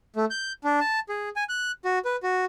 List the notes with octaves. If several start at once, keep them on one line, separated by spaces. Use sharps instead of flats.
A3
G6
D4
A5
G#4
G#5
F#6
F#4
B4
F#4